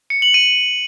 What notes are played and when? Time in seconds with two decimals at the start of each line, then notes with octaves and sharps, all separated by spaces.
0.10 C#7
0.22 F#7
0.34 D#7